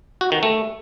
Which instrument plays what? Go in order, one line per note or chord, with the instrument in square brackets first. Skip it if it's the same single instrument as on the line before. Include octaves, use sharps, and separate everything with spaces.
[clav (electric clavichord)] F#4
D#3
A3